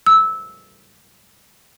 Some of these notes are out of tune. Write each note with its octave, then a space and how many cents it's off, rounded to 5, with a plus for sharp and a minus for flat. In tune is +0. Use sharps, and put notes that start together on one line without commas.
E6 -15